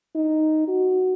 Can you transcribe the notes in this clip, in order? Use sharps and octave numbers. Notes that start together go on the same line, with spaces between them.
D#4
F#4